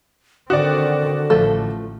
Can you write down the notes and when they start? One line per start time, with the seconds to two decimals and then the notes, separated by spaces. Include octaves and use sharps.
0.50 D3 D#3 C4 F#4 D5
1.30 A1 F3 A3 A4